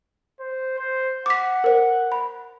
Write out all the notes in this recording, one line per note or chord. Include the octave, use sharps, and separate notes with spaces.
C5
C5
F#5 D6 B6
A#4 C5
B5